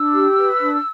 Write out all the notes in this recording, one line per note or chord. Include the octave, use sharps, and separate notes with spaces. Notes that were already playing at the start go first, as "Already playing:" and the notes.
Already playing: D4 E6
G4
B4
D4